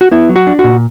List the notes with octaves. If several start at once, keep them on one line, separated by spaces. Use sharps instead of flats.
F#4
B3 E4
F#3
F#4
D4
F#4
A#2